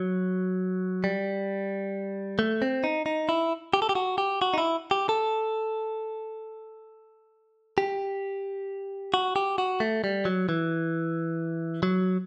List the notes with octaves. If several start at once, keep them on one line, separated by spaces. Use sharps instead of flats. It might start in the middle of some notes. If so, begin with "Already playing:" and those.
Already playing: F#3
G3
A3
C4
D#4
D#4
E4
G4
A4
G4
F#4
G4
F#4
D#4
E4
G4
A4
G4
F#4
G4
F#4
A3
G3
F#3
E3
F#3